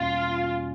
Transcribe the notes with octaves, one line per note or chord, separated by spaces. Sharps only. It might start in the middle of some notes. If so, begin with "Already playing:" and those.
Already playing: E2 B2 G3 A#3 C#4 F4